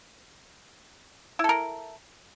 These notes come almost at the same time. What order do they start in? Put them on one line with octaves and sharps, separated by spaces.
E4 A4 A#4